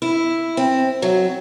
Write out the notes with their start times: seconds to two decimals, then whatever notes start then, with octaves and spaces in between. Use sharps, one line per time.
0.02 E4
0.57 C4
1.02 F#3